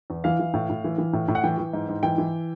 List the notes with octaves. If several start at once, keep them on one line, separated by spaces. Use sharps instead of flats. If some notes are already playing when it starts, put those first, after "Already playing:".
E2
E3 F5
E3
A2
A2
E3
E3
A2
A2
F#5
E3 G5
E3
G#2
G#2
E3 G5
E3